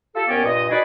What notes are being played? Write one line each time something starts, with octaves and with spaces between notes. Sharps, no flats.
F4 G4 A4
D#2 B3 C#4 D5 G5
G2 A#2 D#5
D#4 F#4 G#4 B4 D5